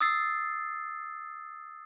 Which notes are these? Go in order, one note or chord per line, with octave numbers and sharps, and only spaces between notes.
D#6 E6 A6 C7